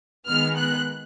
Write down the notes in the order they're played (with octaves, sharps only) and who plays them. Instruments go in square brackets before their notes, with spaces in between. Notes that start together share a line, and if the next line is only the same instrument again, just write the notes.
[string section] D#3 G#3 B3 F6
F#6